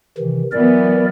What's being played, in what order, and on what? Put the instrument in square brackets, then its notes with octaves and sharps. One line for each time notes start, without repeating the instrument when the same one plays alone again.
[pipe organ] C3 D#3 E3
[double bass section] E3 F#3 B3 [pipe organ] A#4 D5